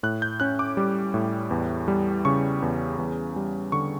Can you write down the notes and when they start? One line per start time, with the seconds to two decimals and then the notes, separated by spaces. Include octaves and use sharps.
0.03 A2 F#6
0.22 G6
0.40 C#4 F#6
0.59 D6
0.77 G3
1.14 A2
1.51 E2
1.88 G3
2.25 C#3 C#6
2.62 E2
2.98 E2
3.36 G3
3.72 D3 C#6